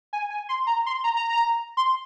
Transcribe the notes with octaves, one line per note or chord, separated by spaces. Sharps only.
G#5
G#5
C6
A#5
C6
A#5
A#5
A#5
C6